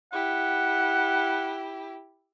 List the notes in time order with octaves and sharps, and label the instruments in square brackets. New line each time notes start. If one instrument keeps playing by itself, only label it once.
[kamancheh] E4 G4 [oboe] F#5